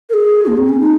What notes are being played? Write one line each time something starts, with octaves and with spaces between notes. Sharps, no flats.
A#4
G#4
A#3
C4
C#4
D#4